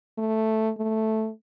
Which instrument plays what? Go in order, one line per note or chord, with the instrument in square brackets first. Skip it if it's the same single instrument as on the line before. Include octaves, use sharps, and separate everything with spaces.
[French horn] A3
A3